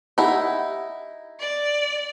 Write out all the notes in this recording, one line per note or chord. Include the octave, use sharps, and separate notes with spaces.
D#4 E4 G4 F#5
D5